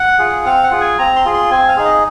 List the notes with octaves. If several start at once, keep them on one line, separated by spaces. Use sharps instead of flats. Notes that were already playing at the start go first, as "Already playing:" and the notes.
Already playing: F#5
F4 G#4
C4 F5
F#5
F4 G#4
G#5
C4 A#5
C6
F4 G#4
C6
C4 G#5
F5
D#4 G#4
D#5